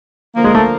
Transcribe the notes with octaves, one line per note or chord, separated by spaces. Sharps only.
D3 F3 A#3
G#3
A3